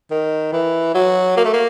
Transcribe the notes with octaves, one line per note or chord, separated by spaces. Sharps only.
D#3
E3
F#3
A#3
A3
A#3